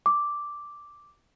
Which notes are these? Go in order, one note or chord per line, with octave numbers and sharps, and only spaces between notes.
D6